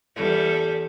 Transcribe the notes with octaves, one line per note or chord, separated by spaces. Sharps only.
E2 G3 A4